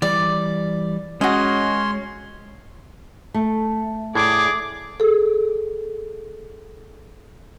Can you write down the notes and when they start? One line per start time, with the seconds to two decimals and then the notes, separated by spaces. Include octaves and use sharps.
0.02 E3 G3 D5
1.21 G#3 C#4 F#4 C#5 D#5 C6
3.34 A3
4.15 A2 G#4 D5 D6
5.00 G#4 A4